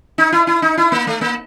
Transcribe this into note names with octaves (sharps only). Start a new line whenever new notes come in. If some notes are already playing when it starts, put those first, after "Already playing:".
D#4
E4
E4
D#4
E4
A#3
A3
A#3